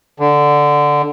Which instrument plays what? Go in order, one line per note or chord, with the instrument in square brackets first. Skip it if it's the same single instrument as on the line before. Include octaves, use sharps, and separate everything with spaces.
[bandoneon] D3